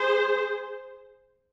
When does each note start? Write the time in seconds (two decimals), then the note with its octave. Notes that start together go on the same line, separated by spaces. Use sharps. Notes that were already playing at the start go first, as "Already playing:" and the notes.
Already playing: G#4 C5